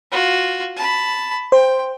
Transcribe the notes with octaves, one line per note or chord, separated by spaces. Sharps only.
F4 F#4
A5 B5
C5 G5